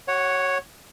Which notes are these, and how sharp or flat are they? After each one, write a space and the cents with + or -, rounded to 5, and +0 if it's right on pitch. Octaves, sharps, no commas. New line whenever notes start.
F#4 +45 C#5 -5 F#5 +0